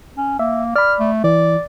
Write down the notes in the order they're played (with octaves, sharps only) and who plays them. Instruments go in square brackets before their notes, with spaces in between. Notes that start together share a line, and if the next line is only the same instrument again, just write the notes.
[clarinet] C#4
[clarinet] A#3 [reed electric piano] E5
[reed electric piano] D5 B5 [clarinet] F6
[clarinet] A3
[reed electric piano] E3 [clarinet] D5